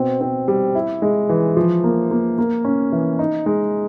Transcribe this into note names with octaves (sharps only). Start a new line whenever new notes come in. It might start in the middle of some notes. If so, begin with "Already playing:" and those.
Already playing: B2 C4
C4
G3
E4
G#3
E3
F3
A#3
A#3
A#3
C#4
E3
D#4
G#3